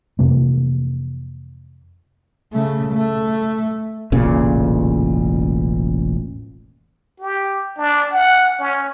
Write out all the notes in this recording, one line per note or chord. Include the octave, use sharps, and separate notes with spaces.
F2 C3 E3 A#3
C#3 A3
A3
E1 A1 A#2 C#3
G4
D4
F#5
C#4